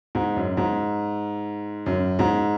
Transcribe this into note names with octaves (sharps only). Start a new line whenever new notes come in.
G#2
F#2
G#2
F#2
G#2